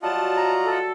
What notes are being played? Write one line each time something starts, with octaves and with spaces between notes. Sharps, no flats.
F#3 G3 F4 F#4 D#5 F#5 A5
E5 A#5 C#6
A4